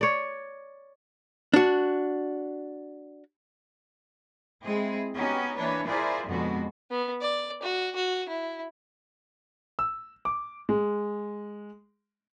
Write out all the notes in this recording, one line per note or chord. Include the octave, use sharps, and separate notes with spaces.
C#5 D5
D4 F#4
G#3 C4 E4 G#4
B3 C#4 D#4 F#4 G4
E3 A#3 D4 B4 C#5
E4 F4 G#4 A#4 C5 D5
F2 B2 D3 G#3 B3 F#4
B3
D5
F#4
F#4
E4
E6
D6
G#3